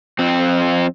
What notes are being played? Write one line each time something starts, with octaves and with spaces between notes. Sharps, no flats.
F2 C4